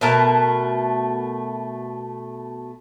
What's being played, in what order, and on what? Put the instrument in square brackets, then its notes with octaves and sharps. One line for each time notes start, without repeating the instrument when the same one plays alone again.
[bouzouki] B2 A3 A#4 A5